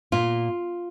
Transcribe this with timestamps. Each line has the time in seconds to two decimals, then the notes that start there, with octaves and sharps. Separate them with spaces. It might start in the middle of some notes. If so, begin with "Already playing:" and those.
0.12 A#2 F4